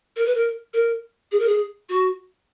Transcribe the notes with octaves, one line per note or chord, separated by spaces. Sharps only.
A#4
B4
A#4
A#4
G#4
A#4
G#4
F#4